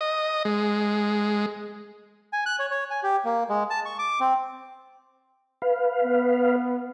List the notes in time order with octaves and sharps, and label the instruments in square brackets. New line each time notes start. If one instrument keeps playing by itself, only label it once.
[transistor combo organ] D#5
G#3
[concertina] G#5
F#6
C#5
C#5
G#5
G4
A#3
G#3
A5
C#6
D6
C4
[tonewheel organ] B4 F5
[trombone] B3